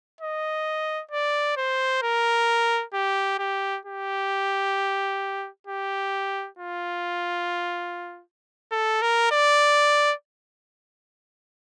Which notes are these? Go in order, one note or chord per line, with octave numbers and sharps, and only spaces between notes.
D#5
D5
C5
A#4
G4
G4
G4
G4
F4
A4
A#4
D5